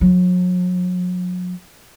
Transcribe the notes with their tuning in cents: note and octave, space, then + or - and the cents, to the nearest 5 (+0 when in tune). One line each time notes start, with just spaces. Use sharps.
F#3 -40